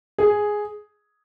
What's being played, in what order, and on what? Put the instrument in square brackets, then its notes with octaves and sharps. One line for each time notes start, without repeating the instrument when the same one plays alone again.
[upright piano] G#4